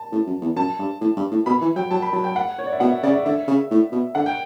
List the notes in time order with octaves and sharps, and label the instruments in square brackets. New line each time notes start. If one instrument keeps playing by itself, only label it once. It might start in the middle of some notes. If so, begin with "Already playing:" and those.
Already playing: [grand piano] A5
[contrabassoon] A2
F#2
E2
[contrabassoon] F#2 [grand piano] A5
[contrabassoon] G2
A2
G2
A2
[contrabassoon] B2 [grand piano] B5
[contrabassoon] E3
[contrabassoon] F#3 [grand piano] G5
[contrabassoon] F#3 [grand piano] A5
[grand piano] B5
[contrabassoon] F#3 [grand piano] A5
[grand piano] G5
F#5
C#5
D5
E5
[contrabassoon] B2 [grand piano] F#5
[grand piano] E5
[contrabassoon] C#3 [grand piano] D5
[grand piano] E5
[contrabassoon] D3 [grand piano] E5
[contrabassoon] C#3
A2
B2
[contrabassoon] D3 [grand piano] F#5
[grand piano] G5